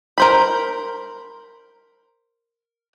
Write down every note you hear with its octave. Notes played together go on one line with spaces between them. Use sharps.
A#4 C5 B5